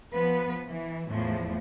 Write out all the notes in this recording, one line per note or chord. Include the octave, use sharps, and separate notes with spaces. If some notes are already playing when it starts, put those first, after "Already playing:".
F3 B3 B4
E3
E2 A2 F3